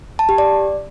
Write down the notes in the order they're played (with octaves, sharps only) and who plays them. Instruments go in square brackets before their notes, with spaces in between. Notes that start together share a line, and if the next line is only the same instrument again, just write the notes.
[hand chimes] A5
G4
D5